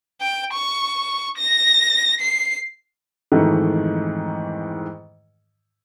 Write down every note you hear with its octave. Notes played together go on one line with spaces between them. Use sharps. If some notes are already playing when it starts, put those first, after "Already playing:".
G5
C#6
A#6
C7
F2 G#2 D#3 E3 A3